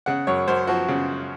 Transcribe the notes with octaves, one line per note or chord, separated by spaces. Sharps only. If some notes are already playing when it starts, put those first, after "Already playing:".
C#3 F#5
F#2 C#5
F#2 C5
F3 F#4
C#3